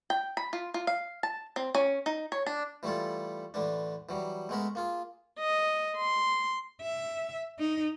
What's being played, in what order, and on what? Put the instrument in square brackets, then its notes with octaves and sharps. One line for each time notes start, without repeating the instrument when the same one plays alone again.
[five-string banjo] G5
B5
F4
F4
F5
A5
C4
C#4
D#4
C#5
D4
[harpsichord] E3 G3 A3 E4 F4 A4
A1 D3 E3 D4
E3 F#3 G3
G#3 A3 B3 G#4 A#4 E5
A#3 F4 G#4
[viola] D#5
C6
[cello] E5
D#4